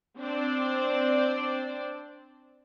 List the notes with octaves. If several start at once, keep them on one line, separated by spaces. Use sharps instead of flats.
C4 D4 C5 D5